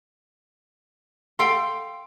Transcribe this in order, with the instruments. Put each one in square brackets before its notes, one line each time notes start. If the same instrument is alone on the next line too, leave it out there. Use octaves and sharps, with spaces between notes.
[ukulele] A4 F5 G5 [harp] C6